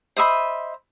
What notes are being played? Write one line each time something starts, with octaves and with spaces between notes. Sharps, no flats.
C5 D#5 E5 B5